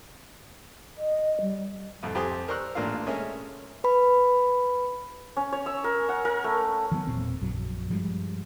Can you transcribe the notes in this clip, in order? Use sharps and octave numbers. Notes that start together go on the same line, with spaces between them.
D#5
G3
C2 F2
F2 G4 C5 G#5 D#6
A#4 C5 D5 C#6 E6 F#6
A1 A#2 A#3 D4 F4 F5
G#3 A3 C#4 G#4 A#4 E5
B4 B5
C#4
C#5
E6
A#4
F#5
A#4
A3
D#3 F#3 A#3 B3
E1 A#2 C4
A#1 F#2 F#3
G2 F3 G3 G#3